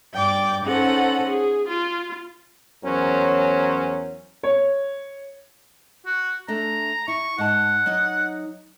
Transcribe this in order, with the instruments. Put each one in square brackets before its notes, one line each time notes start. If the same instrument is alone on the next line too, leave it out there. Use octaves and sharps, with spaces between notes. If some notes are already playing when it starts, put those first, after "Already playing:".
[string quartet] G2 D5 G5 D6
C#4 D#4 A4 C5 F#5
G#4
F4
[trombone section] E2 F#3 C#4 A#4 C5
[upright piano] C#5
[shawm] F#4
[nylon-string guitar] A3 D4 A4 [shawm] A#5
[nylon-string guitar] E4 [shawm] C#6
[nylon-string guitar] G#2 A5 [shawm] F#5
[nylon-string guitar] F#3 D#4